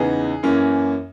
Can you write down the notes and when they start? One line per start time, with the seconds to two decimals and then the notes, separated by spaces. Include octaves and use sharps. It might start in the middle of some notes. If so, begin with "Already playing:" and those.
Already playing: E2 C#3 E3 B3 D#4 G#4
0.43 F#2 E3 A#3 C#4